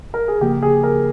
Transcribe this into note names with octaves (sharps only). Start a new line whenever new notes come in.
A#4
G#4
C#3 F3 A#3 G4
G#4
A#4